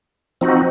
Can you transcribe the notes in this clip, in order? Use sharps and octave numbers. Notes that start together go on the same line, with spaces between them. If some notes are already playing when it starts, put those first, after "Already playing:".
F3 C4 D#4 F#4